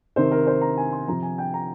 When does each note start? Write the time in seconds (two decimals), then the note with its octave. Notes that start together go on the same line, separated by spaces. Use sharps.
0.16 C3 D#3 C5
0.31 A#4
0.47 C5
0.61 A#5
0.77 G#5
0.93 C6
1.08 C3 F3 A#5
1.23 G#5
1.38 G5
1.54 A#5